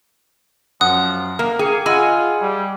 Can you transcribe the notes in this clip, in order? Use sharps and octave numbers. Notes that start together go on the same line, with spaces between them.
F#2 F3 F#5 D#6 F#6
A#3 A#4
A#3 G#4 G5 C#7
F4 G#4 D#5 F#5 G#5 B5 E6
G3